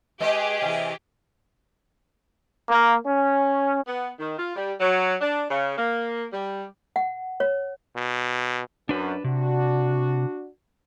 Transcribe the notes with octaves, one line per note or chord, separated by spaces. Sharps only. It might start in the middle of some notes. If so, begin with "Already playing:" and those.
G#3 G4 G#4 B4 D#5
C3 E3 E4
A#3
C#4
B3
D#3
F4
G3
F#3
D4
C#3
A#3
G3
F#5
C#5
B2
F#2 D4 B4
C3 D4 F#4